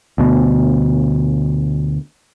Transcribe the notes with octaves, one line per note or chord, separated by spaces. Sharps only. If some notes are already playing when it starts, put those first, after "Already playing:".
D2 B2